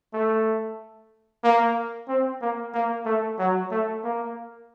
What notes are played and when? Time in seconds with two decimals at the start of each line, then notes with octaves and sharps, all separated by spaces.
0.13 A3
1.44 A#3
2.08 C4
2.41 A#3
2.74 A#3
3.05 A3
3.39 F#3
3.71 A3
4.04 A#3